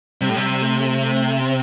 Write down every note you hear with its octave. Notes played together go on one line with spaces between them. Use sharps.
C3 G3
A2
C3
G3
A3
A3
C4